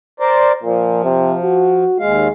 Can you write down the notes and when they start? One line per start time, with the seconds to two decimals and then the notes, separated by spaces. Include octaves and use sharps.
0.20 A#4 C5 D5
0.63 A#2 F3
1.04 C3
1.43 F#4
2.00 D#2 G#3 F5